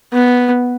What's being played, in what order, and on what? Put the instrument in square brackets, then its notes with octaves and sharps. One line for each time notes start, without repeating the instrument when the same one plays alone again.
[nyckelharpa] B3